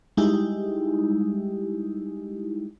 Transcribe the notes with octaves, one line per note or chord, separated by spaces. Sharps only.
G3 G#3 D#4 E4 G4